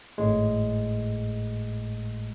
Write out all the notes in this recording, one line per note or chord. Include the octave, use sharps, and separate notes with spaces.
G#1 A2 G#3